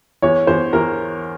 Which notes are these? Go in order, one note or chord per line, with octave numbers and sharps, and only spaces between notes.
E2 C#5
E2 C5
E2 A#4